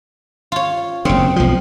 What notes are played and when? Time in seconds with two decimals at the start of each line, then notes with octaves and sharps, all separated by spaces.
0.52 F4 C#5
1.05 F#1 C#3 C4
1.36 B1 F3